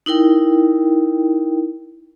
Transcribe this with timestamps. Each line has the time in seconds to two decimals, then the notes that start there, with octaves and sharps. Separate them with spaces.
0.06 D#4 E4 A#4 G5